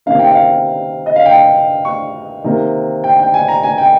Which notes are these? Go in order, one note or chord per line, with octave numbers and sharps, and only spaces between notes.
C3 D#3 A#3 C#4 F5
G5
F5
D#5
F5
G5
C#6
C3 D#3 A#3
G5
G5
G#5
A#5
G#5
G5